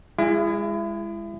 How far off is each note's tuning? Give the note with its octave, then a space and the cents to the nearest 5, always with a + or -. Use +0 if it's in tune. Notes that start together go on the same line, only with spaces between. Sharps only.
G#3 -20 E4 +30